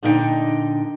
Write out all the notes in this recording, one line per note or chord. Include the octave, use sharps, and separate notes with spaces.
A#2 D3 D4 D#4 B4 G5